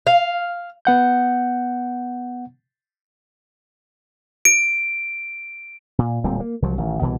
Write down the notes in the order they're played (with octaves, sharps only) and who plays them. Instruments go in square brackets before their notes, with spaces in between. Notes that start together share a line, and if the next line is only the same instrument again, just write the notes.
[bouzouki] F5
[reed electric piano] B3 F#5 G6
[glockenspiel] D7
[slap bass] A#2
D1 A#2 G3 C4
A#3
C2 F3 F#3
A1 D#3
C2 B2 E3